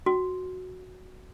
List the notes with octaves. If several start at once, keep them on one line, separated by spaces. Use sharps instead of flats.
F#4